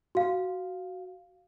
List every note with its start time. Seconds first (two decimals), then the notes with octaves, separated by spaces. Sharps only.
0.15 F#4 F5